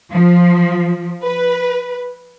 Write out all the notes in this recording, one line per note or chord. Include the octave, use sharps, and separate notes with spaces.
F3
B4